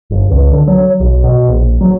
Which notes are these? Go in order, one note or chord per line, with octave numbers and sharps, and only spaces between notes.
G1
C#2
D3
F#3
B1
B2
A#1
F#3